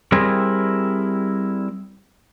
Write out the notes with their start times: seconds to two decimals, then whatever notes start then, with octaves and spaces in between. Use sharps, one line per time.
0.12 G3 C4 E4 G#4 A#4